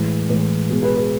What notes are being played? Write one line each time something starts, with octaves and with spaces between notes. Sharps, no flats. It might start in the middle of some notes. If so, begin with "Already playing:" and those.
Already playing: A2 E3 G#3
A2 E3 G#3
B2 G#3 B3 G#4
G#4 B4
G#4 B4